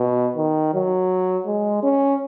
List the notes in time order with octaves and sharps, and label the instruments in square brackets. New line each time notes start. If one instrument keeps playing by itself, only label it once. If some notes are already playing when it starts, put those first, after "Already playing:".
Already playing: [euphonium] B2
D#3
F#3
G#3
C#4